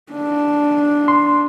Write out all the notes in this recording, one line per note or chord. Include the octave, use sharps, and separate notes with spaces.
D4
C6